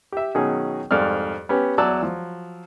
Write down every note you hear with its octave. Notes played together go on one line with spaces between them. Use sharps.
G4 E5
B2 D#3 F#3 C#4 D#4 G#4
C2 F2 G#2 D5 F6
B3 C#4 G4
E2 F#3 D5 A5 E6
F3 F#3